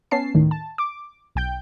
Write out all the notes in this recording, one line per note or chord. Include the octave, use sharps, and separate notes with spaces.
B3 C#4 A5 C7
D#2 A2 D#3
A5
D6
B1 G5 G6